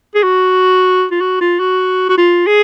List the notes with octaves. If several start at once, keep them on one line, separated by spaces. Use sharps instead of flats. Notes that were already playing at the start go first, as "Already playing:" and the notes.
G#4
F#4
F4
F#4
F4
F#4
F#4
F4
G#4